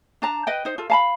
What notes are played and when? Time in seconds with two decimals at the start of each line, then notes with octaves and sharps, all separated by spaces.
0.22 D4 A5 A#5
0.47 B4 D#5 G5
0.65 D#4 C5
0.78 F4 A4
0.90 F5 A5 B5